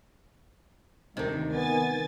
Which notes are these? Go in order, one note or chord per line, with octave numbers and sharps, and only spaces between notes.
D2 C3 D#3 D#4
B3 G#5 A6